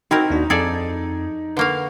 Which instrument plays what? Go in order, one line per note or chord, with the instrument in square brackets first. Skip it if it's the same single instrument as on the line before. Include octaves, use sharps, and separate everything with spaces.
[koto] C4 E4 A#4 [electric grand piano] D#4 [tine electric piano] F#4
[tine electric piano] D#2 D4 F#4
[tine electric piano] F2 [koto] G#4 A4 D5
[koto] D3 A#3 F5 [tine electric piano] B4 F#5 C#6